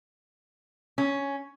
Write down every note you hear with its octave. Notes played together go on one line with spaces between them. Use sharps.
C#4